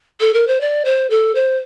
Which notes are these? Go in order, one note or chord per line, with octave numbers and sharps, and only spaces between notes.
A4
A#4
C5
D5
C5
A4
C5